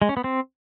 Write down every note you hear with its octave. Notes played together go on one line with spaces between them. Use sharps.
G#3
C#4
B3
C4